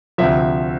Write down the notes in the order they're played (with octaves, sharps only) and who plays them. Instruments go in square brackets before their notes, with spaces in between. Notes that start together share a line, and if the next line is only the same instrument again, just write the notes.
[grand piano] D2 C3 F3 E5